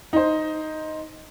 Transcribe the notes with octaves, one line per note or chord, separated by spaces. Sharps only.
D#4 C5